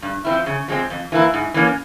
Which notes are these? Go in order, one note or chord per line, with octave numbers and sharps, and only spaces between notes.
G2
F3 C4 E4
C#3
F3 G#3 C4
F2
E3 A#3 E4
G#2
E3 A#3 C#4